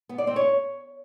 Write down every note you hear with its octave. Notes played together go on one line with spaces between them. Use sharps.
B3
D5
C4
C#5